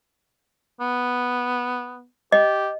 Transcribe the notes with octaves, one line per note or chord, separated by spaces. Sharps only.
B3
G4 D#5